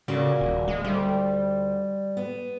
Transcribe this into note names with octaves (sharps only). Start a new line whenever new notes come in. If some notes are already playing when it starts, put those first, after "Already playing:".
A#2 C#3 A#3 F#4
D#1
G#3
D2 G3
B3